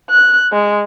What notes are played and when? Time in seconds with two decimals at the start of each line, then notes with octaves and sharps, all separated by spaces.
0.10 F#6
0.52 G#3